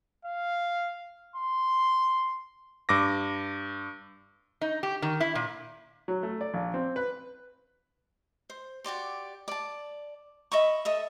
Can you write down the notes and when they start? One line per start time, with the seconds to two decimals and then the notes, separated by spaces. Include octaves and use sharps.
0.25 F5
1.36 C6
2.89 G2 D6 A#6
4.61 D#4
4.83 G4
5.02 D#3
5.20 E4
5.35 A#2
6.08 F#3
6.23 A3
6.41 D5
6.54 A#1
6.74 C4
6.96 B4
8.50 C5
8.84 F#4 G4 D5 C6
9.48 D5 A5
10.52 D#5 E5 B5 C#6
10.85 A4 D#5 E5